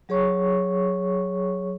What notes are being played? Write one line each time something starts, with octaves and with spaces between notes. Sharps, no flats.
F#3 G#4 C#5 C#6